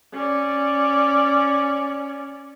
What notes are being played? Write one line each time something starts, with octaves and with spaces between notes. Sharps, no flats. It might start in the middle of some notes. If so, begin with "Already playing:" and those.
C#4 D5